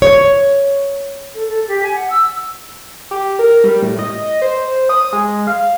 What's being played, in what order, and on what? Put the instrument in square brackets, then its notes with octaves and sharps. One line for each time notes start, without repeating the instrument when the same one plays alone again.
[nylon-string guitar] C#5
[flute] A4
A4
G4
G#5
F#5
E6
[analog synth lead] G4
A#4
G3
A2
D#5
C5
D#6
G#3
F5